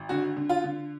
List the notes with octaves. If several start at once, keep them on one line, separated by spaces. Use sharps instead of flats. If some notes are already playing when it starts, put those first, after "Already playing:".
Already playing: G#1
D3 F#4
D3
F4
D3